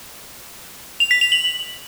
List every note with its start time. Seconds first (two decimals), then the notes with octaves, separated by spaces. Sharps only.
1.00 F7
1.11 B6
1.21 F7
1.32 F#7